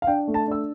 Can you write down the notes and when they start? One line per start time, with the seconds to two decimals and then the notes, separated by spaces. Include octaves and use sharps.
0.02 F5
0.07 D4 G5
0.28 A3
0.34 A5
0.47 D4 E6